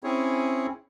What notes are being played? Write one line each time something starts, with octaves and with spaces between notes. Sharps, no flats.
C4 C#4 E4 G#4 C#5